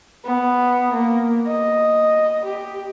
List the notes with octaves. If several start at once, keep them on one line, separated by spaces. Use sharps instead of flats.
B3
A#3
D#5
G4